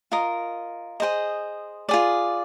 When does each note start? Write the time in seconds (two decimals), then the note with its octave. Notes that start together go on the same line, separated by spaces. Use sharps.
0.12 F4 A#4 D#5
1.00 G#4 C5 D#5
1.89 F4 G#4 D5